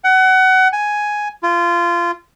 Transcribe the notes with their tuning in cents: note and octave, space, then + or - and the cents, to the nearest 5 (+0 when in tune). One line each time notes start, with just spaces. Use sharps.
F#5 +25
G#5 +5
F4 -20